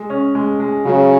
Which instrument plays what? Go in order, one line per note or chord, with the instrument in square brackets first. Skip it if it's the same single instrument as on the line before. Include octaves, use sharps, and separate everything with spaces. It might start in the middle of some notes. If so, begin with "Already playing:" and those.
Already playing: [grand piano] G#3
C#4
G#3
G#3
[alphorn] C#3 [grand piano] F#3